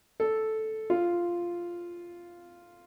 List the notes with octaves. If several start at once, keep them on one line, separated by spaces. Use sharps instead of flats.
A4
F4